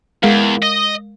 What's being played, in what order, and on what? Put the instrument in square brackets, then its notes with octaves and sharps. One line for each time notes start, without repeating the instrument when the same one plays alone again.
[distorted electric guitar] E2 [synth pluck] G#3 A#4 F5
[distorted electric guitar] D#5